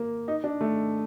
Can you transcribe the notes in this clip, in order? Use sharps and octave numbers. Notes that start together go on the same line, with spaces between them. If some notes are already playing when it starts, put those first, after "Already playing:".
Already playing: A#3
D#4
D4
A3